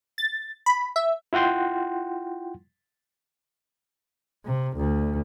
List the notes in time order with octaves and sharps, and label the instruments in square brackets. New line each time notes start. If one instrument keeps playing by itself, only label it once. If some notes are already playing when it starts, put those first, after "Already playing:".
[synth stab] A6
B5
E5
[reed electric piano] E4 F4 F#5 G5 C6
[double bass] C3
D2